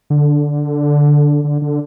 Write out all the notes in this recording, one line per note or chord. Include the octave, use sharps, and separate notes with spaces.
D3
D3
D3